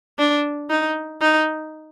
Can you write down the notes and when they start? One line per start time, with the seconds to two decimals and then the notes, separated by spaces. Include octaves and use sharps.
0.19 D4
0.70 D#4
1.22 D#4